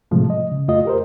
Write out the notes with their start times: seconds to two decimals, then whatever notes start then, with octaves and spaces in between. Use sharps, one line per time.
0.11 A2 C3 F3 G#3 A3
0.30 D#5
0.52 C#3
0.68 F2 A3 F4 D#5
0.85 G4 A#4 C5